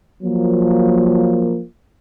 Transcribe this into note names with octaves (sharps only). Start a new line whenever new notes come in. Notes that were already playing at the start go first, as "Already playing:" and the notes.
F3 F#3 A#3